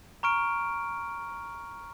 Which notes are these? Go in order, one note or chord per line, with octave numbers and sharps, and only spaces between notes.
A#5 C#6 F6 D7